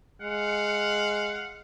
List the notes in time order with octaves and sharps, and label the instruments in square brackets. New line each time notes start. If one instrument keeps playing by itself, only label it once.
[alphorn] G#3 [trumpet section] F5 F#5